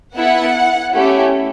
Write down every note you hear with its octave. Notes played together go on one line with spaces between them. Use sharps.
B3 E4 A4 F#5
A3 C#4 E4 G4